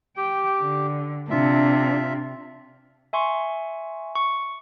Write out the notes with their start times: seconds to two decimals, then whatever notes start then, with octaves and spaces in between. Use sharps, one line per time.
0.17 G4 G5
0.60 D3
1.31 C3 D4 F4 E5
3.13 E5 G#5 C6 C#6
4.15 C#6